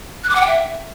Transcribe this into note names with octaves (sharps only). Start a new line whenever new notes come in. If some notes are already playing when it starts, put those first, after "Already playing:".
F#6
D6
F#5
G5
E5